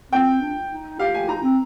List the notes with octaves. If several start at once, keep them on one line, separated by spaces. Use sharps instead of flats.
C4 G5
D4
D#4
G4 F5
G#5
D#4 A#5
C4